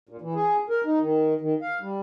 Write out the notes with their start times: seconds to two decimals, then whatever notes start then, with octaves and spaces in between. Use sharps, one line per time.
0.09 A#2
0.21 E3
0.35 G#4
0.69 A#4
0.85 D#4
1.00 D#3
1.41 D#3
1.62 F5
1.81 G3